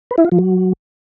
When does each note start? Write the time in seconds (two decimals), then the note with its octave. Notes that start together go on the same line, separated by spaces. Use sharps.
0.11 B4
0.18 E4
0.25 F4
0.32 F3
0.39 F#3